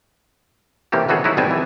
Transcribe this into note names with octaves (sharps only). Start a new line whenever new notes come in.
C3 E3 A#3 C#4 G4 A4
B2 E3 F#3 F#4 G#4 A4
F#3 D#4 E4 F#4
G#1 B2 G3 C4 G#5 A5
E3